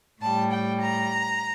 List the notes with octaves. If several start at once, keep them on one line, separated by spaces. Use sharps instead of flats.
A2 G3 A5
G5
A#5